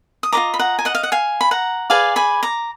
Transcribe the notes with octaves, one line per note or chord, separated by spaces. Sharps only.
D#6
F4 B4 D#5 A#5 D6
B5
F#5 A#5
G#5
D#5 F#5
F5
F#5
F5 G#5
B5
F#5 A#5
G#4 B4 D5 F5 G#5
G#5 B5
A#5 D6